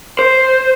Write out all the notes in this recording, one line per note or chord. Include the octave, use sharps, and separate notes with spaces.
C5